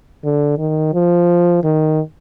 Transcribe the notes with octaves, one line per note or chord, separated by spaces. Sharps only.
D3
D#3
F3
D#3